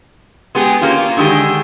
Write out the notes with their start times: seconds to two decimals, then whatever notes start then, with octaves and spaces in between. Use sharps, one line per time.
0.55 G#3 B3 G4 G#4
0.82 A#3 C#4 F4 G4
1.17 D3 D#3 G#3 G4 G#4